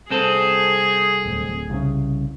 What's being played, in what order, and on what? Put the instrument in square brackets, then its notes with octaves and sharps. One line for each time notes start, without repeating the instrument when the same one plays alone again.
[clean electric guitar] C2 C4 A4 [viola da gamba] G#4
[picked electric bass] D1
C2 C#3